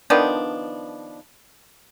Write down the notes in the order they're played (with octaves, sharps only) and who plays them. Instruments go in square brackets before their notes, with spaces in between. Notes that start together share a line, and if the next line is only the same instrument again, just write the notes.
[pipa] D#3 F3 B3 D4